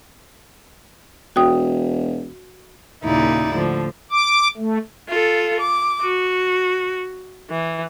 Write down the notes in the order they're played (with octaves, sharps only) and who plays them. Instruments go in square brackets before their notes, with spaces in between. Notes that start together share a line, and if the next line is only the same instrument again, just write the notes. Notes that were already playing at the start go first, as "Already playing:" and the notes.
[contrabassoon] E1 [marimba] F#4 G5 D#6
[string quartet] D#2 A#2 C#3 D#4 E4 D5
A2 D3 F3
[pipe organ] D6
A3
[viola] F4 A4
D6
F#4
E3